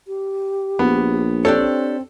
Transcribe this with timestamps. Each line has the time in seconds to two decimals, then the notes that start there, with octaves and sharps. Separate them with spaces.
0.08 G4
0.79 A#1 B3
1.45 C4 D4 G4 A4 C#5